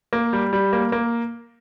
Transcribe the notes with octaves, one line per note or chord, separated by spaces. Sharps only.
A#3
G3
G3
A#3
A#3